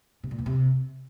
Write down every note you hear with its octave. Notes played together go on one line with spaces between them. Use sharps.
C3
A#2
E2
C3